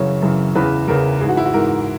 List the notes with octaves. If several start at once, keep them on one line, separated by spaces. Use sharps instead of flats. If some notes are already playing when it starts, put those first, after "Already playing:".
Already playing: F#2 C#3 E3 C#5
F#2 C#3 E3
E2 C#3 E3 B4
E2 C#3 E3 A#4
G#2 E3 G#4
F#4
E4
F#4
G#2 E3 A#4